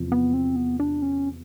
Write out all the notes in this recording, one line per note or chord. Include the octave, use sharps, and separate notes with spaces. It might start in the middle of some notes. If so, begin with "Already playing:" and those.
Already playing: E2 C3 F3
B3
C4
B3
D4
C#4